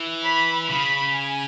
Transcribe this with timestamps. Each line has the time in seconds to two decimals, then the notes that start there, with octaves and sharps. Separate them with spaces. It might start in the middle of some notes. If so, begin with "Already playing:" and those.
Already playing: E3
0.24 B5
0.69 C#3 B5
1.14 G#5